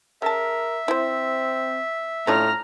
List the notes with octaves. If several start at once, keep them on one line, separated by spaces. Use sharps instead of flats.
C#3 A#4 E5 A5
C4 E4 C5
A2 C#4 D4 F4 A#5 F6